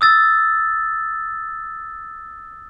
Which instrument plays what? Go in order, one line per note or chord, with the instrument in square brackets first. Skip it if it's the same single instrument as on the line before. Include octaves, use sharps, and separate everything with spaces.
[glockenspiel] D#6 E6 A6